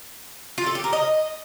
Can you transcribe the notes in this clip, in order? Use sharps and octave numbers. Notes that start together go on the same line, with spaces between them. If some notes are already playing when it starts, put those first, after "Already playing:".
F4
A4
G4
A#4
D#5